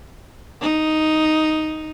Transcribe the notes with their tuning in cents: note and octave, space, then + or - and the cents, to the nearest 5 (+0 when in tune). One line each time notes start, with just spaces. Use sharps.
D#4 +0